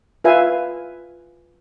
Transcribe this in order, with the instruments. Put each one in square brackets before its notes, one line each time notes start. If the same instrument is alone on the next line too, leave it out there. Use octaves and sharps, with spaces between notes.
[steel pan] F4 B4 E5 F5 G#5